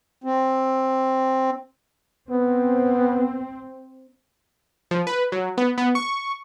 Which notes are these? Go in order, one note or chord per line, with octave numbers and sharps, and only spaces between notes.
C4
B3 C4
F3
B4
F#3
B3
B3
C#6